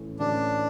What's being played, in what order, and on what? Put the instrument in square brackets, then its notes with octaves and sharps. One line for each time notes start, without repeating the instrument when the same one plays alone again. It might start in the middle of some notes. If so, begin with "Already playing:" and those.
Already playing: [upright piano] A2 E3 A3 C#4
[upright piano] A2 E3 A3 C#4 [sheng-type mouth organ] D4